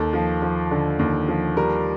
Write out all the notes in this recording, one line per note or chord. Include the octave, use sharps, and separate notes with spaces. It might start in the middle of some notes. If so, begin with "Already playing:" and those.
Already playing: D#2 A4
F3
F3
D3
D#2
F3
G3 A#4